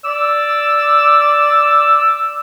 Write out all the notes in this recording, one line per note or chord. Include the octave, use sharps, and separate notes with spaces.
D5 E6